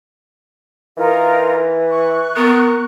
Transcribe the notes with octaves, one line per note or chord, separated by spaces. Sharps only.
E3 D#4 F4 A#4
C#6 F#6
B3 A#4